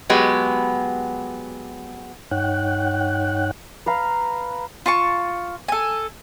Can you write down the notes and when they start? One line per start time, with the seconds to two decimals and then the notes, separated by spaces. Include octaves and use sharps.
0.10 F#3 G#3 B3 G4
2.31 G2 D#4 C#5 F#5 G5 F#6
3.86 B4 F5 A#5
4.86 F4 A5 C#6
5.68 A4 G#5